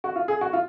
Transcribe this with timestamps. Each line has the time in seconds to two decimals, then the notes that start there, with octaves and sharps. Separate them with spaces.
0.04 F#4
0.16 F4
0.28 G#4
0.41 F#4
0.53 F4